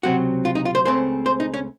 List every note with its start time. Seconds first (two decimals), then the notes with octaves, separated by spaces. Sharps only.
0.03 C#2 C3 F#3 C4 F#4
0.45 F4
0.55 D#4
0.65 F4
0.75 C5
0.85 C#2 C#3 A3 C4 C5
1.26 C5
1.40 D#4
1.54 C#4